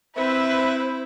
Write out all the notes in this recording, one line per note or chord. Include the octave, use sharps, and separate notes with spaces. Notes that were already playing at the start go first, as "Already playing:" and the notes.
C4 E4 B4 C5 E5